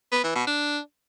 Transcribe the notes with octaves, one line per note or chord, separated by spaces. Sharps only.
B3
E3
B2
D4